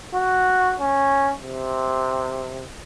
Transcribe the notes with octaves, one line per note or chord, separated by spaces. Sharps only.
F#4
C#4
C3